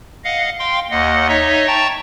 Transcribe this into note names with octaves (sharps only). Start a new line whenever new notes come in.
D#5 F5 F#5
F5 G5 C6
D#2 D#5 F#5
D#4 C#5 D#5 E5
G5 A5 A#5 C#6 A6